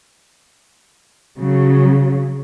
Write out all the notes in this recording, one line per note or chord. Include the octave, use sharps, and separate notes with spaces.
C#3 F#3